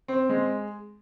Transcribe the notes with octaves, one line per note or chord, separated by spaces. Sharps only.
C4
G#3